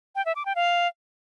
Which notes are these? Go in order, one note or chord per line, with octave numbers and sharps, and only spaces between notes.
G5
E5
D6
G5
F5